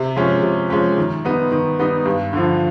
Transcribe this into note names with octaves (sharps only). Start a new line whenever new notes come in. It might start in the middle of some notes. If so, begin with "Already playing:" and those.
Already playing: C3
F3 G#3 C#4
C3
F3 G#3 C#4
D#3
G3 B3 D#4
D#3
G3 B3 D#4
G2
D3 F3